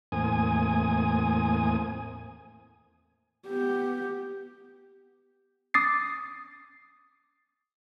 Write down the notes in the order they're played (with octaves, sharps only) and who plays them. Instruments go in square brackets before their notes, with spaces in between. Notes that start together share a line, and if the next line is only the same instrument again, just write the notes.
[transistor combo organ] E2 A2 A#3 C4 G#5 D#6
[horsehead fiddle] B3 G4
[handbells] D6 D#6 A6 C7